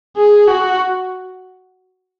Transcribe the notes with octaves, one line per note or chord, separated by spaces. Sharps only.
G#4
F#4